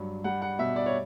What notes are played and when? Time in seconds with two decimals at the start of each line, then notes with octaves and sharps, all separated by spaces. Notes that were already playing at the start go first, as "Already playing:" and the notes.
Already playing: G2 F#3
0.24 G3 F#5
0.42 F#5
0.59 B2 E5
0.76 D5
0.86 C#5